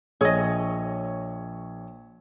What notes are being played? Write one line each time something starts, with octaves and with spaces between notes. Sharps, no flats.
A#1 G#4 C#5 D#5 E6